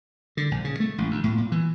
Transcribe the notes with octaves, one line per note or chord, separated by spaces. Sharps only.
D3
A#1
C#3
A3
A1
D2
A2
A#2
E3